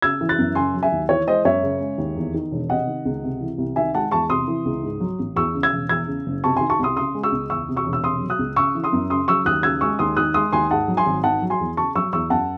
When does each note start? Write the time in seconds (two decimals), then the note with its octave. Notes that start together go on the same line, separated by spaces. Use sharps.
0.02 C#3 E6 G#6
0.21 E3
0.29 F#6 A6
0.39 F#2
0.55 C#3 G#5 C6
0.74 F#3
0.83 E5 G#5
0.92 D#2
1.09 E3 C#5
1.27 G#3 C5 D#5
1.45 F#2 C#5 E5
1.62 C#3
1.81 G#3
1.98 D#2
2.16 E2
2.34 D#3
2.52 E1
2.70 C3 D#5 F#5
2.87 D#3
3.05 C#2
3.23 C3
3.41 E3
3.58 C2
3.76 D#3 E5 G#5
3.94 G#3 F#5 A5
4.11 E2 A5 C#6
4.30 C3 C6 D#6
4.48 E3
4.65 C#2
4.83 G#2
5.00 F#3
5.19 A1
5.36 E2 C#6 E6
5.54 C#3
5.63 E6 G#6
5.72 E1
5.89 E2 E6 G#6
6.07 C#3
6.26 F#1
6.44 C3 A5 C#6
6.57 D#3 G#5 C6
6.70 A5 C#6
6.79 C2 C6 D#6
6.96 C#3 C6 D#6
7.15 G#3
7.23 C#6 E6
7.32 C#2
7.50 E2 C#6 E6
7.69 C3
7.76 C#6 E6
7.86 E1
7.93 E6
8.03 C3 C6 D#6
8.21 F#3
8.30 D#6 F#6
8.39 C#2
8.56 C#3 C#6 E6
8.75 E3
8.84 C6 D#6
8.93 F#2
9.10 C#3 C6 D#6
9.28 F#3 C#6 E6
9.45 D#2 D#6 F#6
9.63 C#3 E6 G#6
9.81 G#3 C#6 E6
9.99 D#2 C6 D#6
10.17 D#3 D#6 F#6
10.34 G#3 C6 D#6
10.52 D#2 G#5 C6
10.70 G#2 F#5 A5
10.88 F#3
10.97 G#5 C6
11.06 G#1
11.24 D#3 F#5 A5
11.42 F#3
11.50 G#5 C6
11.60 E2
11.77 C#3 A5 C#6
11.95 F#3 C#6 E6
12.13 E2 C#6 E6
12.30 F#2 F#5 A5